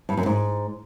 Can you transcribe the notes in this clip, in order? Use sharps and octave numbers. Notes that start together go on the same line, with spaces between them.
G2
F#2
G#2